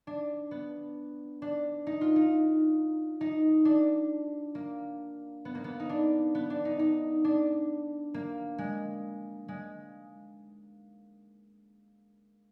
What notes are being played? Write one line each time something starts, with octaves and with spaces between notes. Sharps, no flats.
D4
B3
D4
D#4
F4
D#4
D#4
D4
A#3
B3
A#3
B3
D#4
D4
B3
D4
D#4
D#4
D4
A#3
G#3
G#3